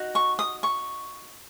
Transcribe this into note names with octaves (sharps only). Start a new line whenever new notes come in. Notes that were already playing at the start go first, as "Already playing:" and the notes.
Already playing: D#4 F#4
C#6
D#6
C#6